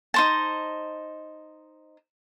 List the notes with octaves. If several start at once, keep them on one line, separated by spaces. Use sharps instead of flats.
D#4 C5 A5